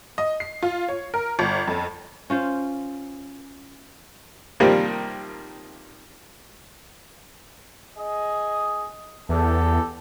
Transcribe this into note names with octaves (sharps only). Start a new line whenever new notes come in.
D#5
C7
F4
C#5
A#4
G1
F2
C#4 F4 C5
C3 D#3 F3 G3 A#3
G#4 D#5
E2 G4 A4